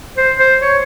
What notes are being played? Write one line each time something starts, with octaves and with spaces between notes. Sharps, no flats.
C5
C5
C#5